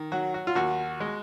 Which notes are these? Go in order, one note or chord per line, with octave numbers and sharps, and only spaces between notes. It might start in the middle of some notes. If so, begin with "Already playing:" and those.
Already playing: D#3
F#3 F#4
F#4
F4
D#2 F#4
G#3